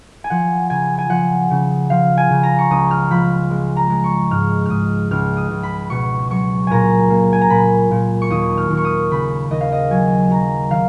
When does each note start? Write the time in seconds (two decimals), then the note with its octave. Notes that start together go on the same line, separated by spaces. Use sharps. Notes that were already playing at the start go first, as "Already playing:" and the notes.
0.24 G#5
0.30 F3 F#5
0.70 C#3 G#5
0.98 G#5
1.09 F3 F#5
1.51 C#3
1.90 F3 F5
2.18 G#5
2.30 C#3
2.43 A#5
2.58 C#6
2.71 C#2 D#6
2.91 F6
3.11 F3 B5
3.51 G#3
3.76 A#5
3.90 G#3
4.04 C#6
4.31 G#2 F6
4.66 G#2 D#6 F6
5.11 C#2 F6
5.37 D#6
5.51 C#2
5.63 B5
5.90 B2 C#6
6.31 F#3 C#6
6.67 A#2 G#5 A#5
7.10 A#3
7.33 G#5
7.41 A#5
7.50 A#2 B5
7.91 A#2
8.22 C#6
8.30 D#2 D#6
8.58 F6
8.70 D#2
8.77 C#6
8.85 D#6
9.11 C#3 B5
9.50 D#2 D#5
9.61 F5
9.72 D#5
9.91 F#3 G#5
10.30 F#3 A#5
10.70 D#3 F5